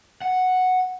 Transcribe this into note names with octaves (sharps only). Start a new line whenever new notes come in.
F#5